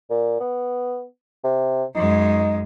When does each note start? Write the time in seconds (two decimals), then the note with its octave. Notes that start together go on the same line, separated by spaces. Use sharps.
0.11 A#2
0.40 B3
1.44 C3
1.95 F#2 G#3 D#4